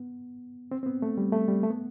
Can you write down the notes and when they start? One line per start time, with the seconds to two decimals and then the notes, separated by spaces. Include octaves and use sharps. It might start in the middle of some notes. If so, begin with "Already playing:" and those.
Already playing: B3
0.71 C4
0.83 C4
0.86 B3
1.02 A3
1.18 G3
1.32 A3
1.48 G3
1.63 A3
1.70 B3